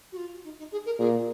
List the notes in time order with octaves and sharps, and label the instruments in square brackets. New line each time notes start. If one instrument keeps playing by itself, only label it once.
[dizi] F#4
F4
D#4
D#4
G#4
A#4
[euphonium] A#2 [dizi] G#4